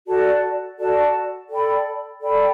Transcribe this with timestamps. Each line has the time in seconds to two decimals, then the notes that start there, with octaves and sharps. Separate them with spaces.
0.07 F#4 A4 D5 A5
0.79 F#4 A4 D5 A5
1.50 A4 D5 G5 B5
2.21 A4 D5 G5 B5